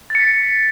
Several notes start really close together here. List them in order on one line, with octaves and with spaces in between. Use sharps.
A6 C#7 B6